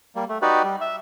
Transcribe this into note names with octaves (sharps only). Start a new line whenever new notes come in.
G3 A#3
A3
D#4 F#4 G4 B4 D5
G3
E5